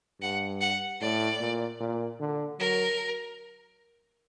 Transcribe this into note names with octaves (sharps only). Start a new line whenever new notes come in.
G2 F#5
F#5
A2 D5
A#2
A#2
D3
F#3 A#4